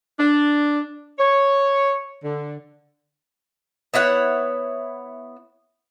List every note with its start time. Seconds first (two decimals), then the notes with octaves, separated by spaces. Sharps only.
0.18 D4
1.19 C#5
2.24 D3
3.94 B3 E4 C#5 F#5